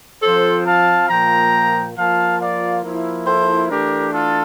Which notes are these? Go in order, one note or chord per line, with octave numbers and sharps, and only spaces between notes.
F3 C4 F4 A4 C5
F5 A5
A#2 F3 A#3 G5 A#5
F3 A#3 F4 F5 A5
D5 F5
F3 A#3 E4
A4 C5
E3 A3 D4 G4 A#4
F4 A4